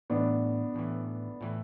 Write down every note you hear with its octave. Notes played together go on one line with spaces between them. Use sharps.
A1 A2 E3 B3 D4
A1 A2 E3
A2 E3